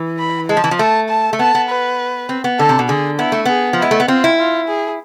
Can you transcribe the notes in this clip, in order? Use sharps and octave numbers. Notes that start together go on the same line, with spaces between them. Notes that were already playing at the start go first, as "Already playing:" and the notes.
Already playing: E3
B5
G#3 A5
F3
E3
F3
A3 A5
A5
A3
B3 A5
B3
B4
C4
B3
D3 A4
C3
B2
D3 G#4
B3 E4
A3
B3 G#4
F3
G#3 E4
A3
B3
C4 F4
E4
F4
G#4